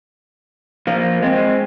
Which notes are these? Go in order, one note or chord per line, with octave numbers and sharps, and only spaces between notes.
F3 A#3
G#3 C4